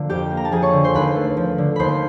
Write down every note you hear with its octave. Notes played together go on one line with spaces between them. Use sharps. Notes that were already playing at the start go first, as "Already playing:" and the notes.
Already playing: D3 F3 A#3
F2 G4 G5
A#3
A#5
A5
F3 G#4 G#5
C#5 C#6
D3
C5 C6
D#2 B4 B5
A3
F3
D3
D#2 C5 B5 C6